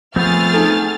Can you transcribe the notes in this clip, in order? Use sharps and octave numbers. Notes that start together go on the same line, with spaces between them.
F3 A3 B3 C4 G#4 F6 A6
D#4 A4